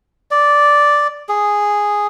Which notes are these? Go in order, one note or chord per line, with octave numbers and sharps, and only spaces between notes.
D5
G#4